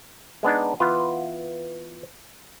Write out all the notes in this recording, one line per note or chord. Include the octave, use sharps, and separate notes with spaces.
G#3 B3 D4 D#4
E3 B3 F4